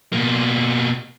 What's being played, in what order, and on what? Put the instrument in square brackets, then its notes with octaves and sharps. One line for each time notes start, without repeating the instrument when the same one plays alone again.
[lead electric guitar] B2 A#3